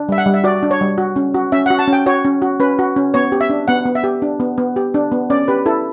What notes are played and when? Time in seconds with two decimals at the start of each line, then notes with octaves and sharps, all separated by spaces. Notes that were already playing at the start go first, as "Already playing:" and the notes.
Already playing: D4
0.09 G3 E5
0.18 F#5
0.26 G3
0.34 E5
0.44 F#4 D5
0.63 D4
0.71 C#5
0.81 G3
0.98 F#4
1.16 C#4
1.35 F#4
1.52 C#4 E5
1.66 F#4 F#5
1.79 A5
1.88 C#4 G5
2.06 F#4 C#5
2.25 C#4
2.42 F#4
2.60 C#4 B4
2.79 F#4
2.96 C#4
3.14 B3 C#5
3.32 G4
3.41 E5
3.50 D4
3.68 B3 F#5
3.86 B3
3.95 E5
4.04 G4
4.22 D4
4.40 B3
4.58 B3
4.76 G4
4.94 D4
5.12 B3
5.30 C#4 D5
5.48 G4 B4
5.66 E4 A4